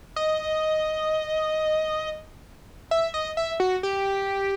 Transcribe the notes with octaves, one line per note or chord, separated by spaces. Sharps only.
D#5
E5
D#5
E5
F#4
G4